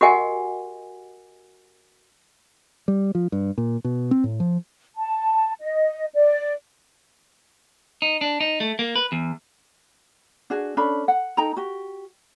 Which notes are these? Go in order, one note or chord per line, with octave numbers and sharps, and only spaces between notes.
F#4 G4 A#4 D#5 F#5 G#5
G3
F3
G2
A#2
B2
C4
A2
F3
A5
D#5
D5
D#4
D4
D#4
A3
A#3
B4
E2
D4 F#4 G#4
C#4 D4 A4 B5
F#5
D#4 A4 G5 A#5
F#4 G4